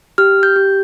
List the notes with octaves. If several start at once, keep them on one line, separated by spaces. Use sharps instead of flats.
G4 F6
G6
G4